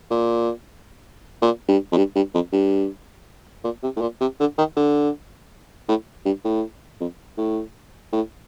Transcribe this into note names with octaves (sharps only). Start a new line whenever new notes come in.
A#2
A#2
G2
F2
G2
G2
F2
G2
A#2
C3
A2
A#2
C3
D3
D#3
D3
A2
G2
A2
F2
A2
A2